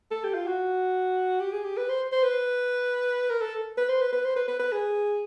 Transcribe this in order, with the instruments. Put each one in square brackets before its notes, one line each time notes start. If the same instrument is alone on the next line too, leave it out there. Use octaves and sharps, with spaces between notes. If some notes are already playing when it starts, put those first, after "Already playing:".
[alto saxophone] A4
G4
F4
F#4
G4
G#4
G4
B4
C5
C5
B4
A#4
A4
B4
C5
B4
B4
C5
B4
B4
B4
G#4